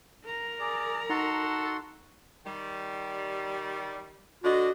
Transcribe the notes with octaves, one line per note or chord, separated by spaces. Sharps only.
A#4 A#5
G#4 D5
D#4 F#4 A4 F#5 C6
D#3 G3
D3 D4 F#4 D#5